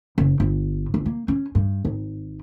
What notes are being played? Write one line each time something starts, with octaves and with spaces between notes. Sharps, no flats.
F#1
G1
G1
A#3
C#4
G2
G#1